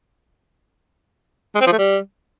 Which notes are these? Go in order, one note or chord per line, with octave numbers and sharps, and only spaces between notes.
G#3
C4
F3
A3
G3